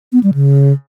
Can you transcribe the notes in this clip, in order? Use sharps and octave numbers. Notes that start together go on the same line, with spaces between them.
B3
G3
C#3